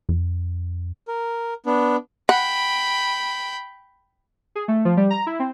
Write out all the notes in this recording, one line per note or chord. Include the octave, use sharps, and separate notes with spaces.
F2
A#4
B3 D4
F#5 G5 B5
G#4
A3
F3
G3
A#5
E4
C4